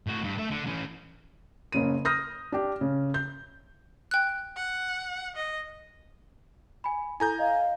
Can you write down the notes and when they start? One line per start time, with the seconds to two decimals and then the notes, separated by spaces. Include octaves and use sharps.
0.07 A2 F#4
0.24 G2
0.38 A3 E5
0.51 D3
0.67 E3 C#4
1.72 F#1 C#3 D#7
2.05 D#6 F6 G6 A#6
2.52 D4 G4
2.81 C#3
3.14 G6
4.11 G5 F#6
4.56 F#5
5.36 D#5
6.84 G#5 B5
7.20 E4 A4 G#5 A#5 G6
7.39 D#5 F5